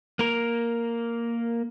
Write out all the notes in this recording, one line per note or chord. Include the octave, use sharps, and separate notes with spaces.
A#3 A#4